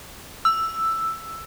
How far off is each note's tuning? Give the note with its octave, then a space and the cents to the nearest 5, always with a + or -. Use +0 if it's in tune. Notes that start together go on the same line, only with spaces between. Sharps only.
E6 +5